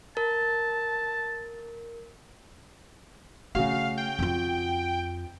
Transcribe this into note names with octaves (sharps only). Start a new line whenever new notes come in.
A#4 A5
C#3 A3 F#4 F5
G5
F2 F4